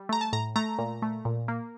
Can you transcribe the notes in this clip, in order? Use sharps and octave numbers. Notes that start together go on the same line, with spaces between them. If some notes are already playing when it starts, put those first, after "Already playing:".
Already playing: G3
A3 A#5
A5
A2 A#5
A3 A#5
A#2
A3
A#2
A#3